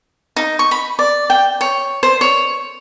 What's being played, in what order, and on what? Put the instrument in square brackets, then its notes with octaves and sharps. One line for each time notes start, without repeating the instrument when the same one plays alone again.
[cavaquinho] D#4
C#6
B5
D5
G5
C#5
C5
C#5